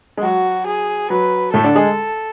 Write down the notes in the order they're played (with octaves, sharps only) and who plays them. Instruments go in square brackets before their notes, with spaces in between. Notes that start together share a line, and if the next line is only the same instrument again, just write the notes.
[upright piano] G#3
[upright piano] F#3 [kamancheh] F#4
[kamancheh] G#4
[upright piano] F#3 [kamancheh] B4
[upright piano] A2 A3 [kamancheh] A4
[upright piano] D3 D4
G#3 G#4